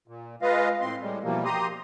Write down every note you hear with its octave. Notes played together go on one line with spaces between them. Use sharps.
A#2
G#3 F4 B4 D#5 F5
A2 C4 C6
A2 G3 G#3
B2 E3 F3 G3 A#3
G4 A#5 C6 D#6